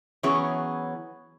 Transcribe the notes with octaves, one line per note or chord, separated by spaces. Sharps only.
E3 F#3 B3 C#4 G#4 C#5